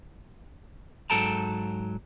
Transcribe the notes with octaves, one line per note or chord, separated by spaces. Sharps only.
G#2 F#3 A4 G5 A5 A#5